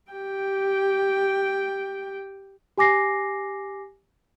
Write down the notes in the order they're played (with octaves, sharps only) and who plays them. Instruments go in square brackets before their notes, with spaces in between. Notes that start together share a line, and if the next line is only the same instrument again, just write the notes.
[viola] G4 G5
[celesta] G4 G#5 D6 A#6 C7